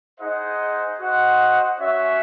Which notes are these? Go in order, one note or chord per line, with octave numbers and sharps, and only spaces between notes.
D#4 G#4 C5 D#5 F#5
F#4 C5 D#5 F#5
C#4 F#4 C#5 E5